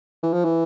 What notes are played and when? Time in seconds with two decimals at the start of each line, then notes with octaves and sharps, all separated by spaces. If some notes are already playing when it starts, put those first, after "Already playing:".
0.23 E3
0.33 F3
0.45 E3